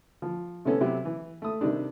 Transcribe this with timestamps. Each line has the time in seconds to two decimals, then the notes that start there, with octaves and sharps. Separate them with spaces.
0.22 F3
0.65 C3 A3 B3 C#4 A4
0.81 C3 F#3 E4 G4
1.05 E3
1.42 A3 D#6
1.61 C3 D#3 G3 D4